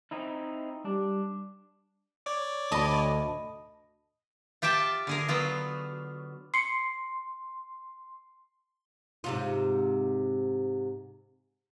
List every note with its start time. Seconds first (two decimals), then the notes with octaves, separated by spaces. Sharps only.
0.11 C4 D#4 E4
0.85 G3 D4
2.26 C#5 D5 D6
2.72 D2 D#5 A5 B5
4.62 F4 G4 E5 G5 A5
5.07 D3 G#4 A#4
5.28 F#3 B3 F4
6.54 C6 C7 C#7
9.24 G#2 C3 F4